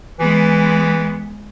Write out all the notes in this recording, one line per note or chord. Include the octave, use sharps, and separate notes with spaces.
E3 G#3 B3